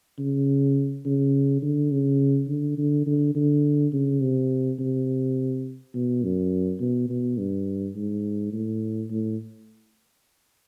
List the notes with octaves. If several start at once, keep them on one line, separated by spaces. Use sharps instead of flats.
C#3
C#3
D3
C#3
D3
D3
D3
D3
C#3
C3
C3
B2
F#2
B2
B2
G2
G#2
A2
A2